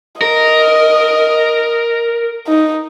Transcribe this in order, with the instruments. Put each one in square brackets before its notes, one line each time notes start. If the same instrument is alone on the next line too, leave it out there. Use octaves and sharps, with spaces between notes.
[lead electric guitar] A#4 [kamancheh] D#5
[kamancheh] D#4